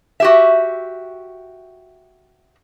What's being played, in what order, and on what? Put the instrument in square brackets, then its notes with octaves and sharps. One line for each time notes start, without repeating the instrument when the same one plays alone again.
[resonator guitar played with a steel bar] F#4 G4 E5